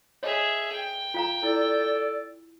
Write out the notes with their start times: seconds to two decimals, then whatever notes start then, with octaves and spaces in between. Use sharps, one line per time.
0.23 G#4 C#5 D#5 E5
0.72 G5
1.14 F4 F5 A#5
1.43 E4 A4 D5